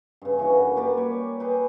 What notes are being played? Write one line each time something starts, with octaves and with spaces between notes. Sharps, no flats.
G2 C#3
E3 F#4
F#2
A#3 G4 B4 D5
G3 G4 C#5
G#4 B4 G5